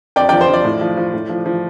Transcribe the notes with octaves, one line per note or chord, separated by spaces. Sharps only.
F2 D5 G5
F3 D5 G5
C5
F3 D5
A2
F3
F3
A2
F3
F3